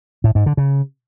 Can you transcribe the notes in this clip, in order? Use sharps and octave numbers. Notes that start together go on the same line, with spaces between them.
A2
G#2
D3
C#3